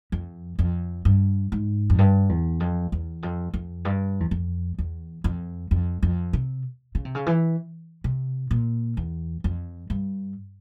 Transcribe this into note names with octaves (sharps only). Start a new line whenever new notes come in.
F2
F2
G2
G#2
F2
G2
E2
F2
E2
F2
F2
G2
E2
F2
E2
F2
F2
F2
C3
C#3
C3
C#3
E3
C3
A#2
E2
F2
G2